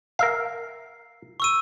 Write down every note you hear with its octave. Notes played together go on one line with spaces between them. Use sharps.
A#4 E5 F5 C7
C#6 E6 D#7